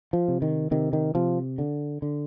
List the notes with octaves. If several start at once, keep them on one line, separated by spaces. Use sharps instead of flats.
F3
C3
D#3
C3 D#3
D#3
C3 F3
D3
D3